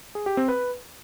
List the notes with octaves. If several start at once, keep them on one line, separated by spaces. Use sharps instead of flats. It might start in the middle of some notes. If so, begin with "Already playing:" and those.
G#4
G4
C4
B4